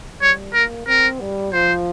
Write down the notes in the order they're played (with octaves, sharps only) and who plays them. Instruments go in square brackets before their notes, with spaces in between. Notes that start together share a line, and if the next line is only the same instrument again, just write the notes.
[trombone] G3 [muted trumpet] C#5
[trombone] A#3 [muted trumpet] A#4
[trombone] C4 [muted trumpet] A#4
[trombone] G3
[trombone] F3 [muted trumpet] C5